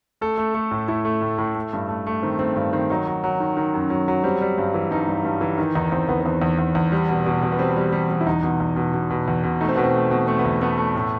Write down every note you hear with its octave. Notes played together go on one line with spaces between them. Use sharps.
A3 A4
A3
A3
A2
A3 E4
A3
A2
A2
A3
G2
A3
A3
D#3 C4
A3 C4
G2
D#3 C4
F#3 D#4
F#3
F#3
D#3
D#3
F#2
F#3
F#3
G3 C4
G3
G2
E3
G2 D#4
G2
G2
E3
D#3 D#4
E2 D#4
E2 C4
E2 B3
B3
E2 C4
E2
E2
E2
G3
B2
B2
B2
B3
G3 C4
G3
G3
G3
E4
E2 D#4
B2
E2
B2
B2
B2
E2
B2
A3 D#4
C4
B2 B3
C4
A3
B2
A3 C4
B3
E2
A3 B3
A3
A2